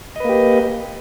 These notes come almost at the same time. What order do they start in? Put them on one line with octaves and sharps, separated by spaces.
D#5 B4 A#3 G4